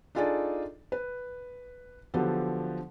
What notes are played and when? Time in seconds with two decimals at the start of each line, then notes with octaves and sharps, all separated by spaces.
0.15 D4 D#4 F4 G#4 A4 D5
0.92 B4
2.14 D3 F3 F#3 B3 G4 A4